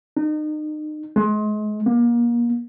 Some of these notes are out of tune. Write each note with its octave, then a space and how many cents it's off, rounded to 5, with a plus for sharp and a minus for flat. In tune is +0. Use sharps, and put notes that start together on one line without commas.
D#4 -35
G#3 +35
A#3 +30